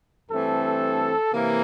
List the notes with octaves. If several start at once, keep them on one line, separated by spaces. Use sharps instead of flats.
G2 E3 A3 C4 A4
C3 E3 A#3